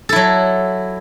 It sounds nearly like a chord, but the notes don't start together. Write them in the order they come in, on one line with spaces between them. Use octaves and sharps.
A4 E4 F#3